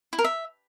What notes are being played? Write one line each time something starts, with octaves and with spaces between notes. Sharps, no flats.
E4
A#4
E5